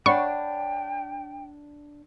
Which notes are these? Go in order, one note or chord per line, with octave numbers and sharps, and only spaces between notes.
D4 C#5 F#5 G5 B5 C#6